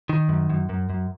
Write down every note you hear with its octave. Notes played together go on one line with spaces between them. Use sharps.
D#3
F#2
F#2
F#2
F#2